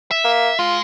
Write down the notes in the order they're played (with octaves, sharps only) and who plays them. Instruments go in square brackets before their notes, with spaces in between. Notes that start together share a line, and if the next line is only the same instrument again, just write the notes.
[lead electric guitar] E5
[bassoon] A#3
[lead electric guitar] G#3 [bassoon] F4